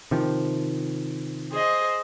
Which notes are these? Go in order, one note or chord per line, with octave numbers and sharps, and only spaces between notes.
C3 D#3 F3
G#4 C5 D#5